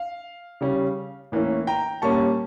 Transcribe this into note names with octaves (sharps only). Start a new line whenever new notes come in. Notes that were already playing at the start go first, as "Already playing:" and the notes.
Already playing: F5
C#3 G3 C#4
A2 E3 A#3 C#4
G5 A#5
A#2 G3 A#3 C#4 A5 C#6